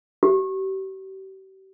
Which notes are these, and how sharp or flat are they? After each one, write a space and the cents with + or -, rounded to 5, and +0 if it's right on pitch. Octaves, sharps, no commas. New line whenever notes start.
G4 -40